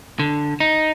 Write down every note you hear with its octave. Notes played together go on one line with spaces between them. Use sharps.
D3
D#4